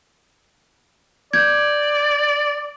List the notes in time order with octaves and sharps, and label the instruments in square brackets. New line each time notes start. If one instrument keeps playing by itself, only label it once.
[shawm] D5 [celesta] G6 G#6